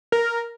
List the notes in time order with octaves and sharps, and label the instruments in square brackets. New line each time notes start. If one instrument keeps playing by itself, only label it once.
[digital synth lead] A#4